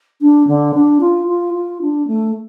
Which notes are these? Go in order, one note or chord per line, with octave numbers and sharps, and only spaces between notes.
D4
D3
D4
F4
F4
F4
D4
A3